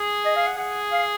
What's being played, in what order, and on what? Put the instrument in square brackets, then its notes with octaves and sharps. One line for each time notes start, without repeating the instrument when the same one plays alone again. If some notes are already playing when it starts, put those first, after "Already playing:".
Already playing: [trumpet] G#4
[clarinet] D#5
F5
F#5
[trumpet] G#4 [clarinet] F#5
[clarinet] F5